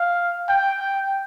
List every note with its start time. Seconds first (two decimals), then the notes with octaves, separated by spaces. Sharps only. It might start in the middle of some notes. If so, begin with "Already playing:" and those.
Already playing: F5
0.49 G5
0.80 G5